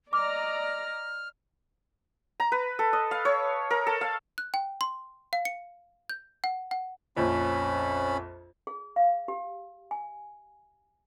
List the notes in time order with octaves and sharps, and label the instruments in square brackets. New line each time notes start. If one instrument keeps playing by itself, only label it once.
[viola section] D5 D#5 A#5 [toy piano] D6 [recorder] F6
[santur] A#5
B4
A4
D#5
F5
C#5
A#4
A4
F5
[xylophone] F#6
G5
C6
F5
C#7
G6
F#5
F#5
[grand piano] A#1 F2 [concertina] C#4 B5
[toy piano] G#4
F5
G4
G#5